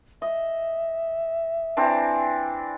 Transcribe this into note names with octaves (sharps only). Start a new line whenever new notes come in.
D#5 E5
E3 C4 D4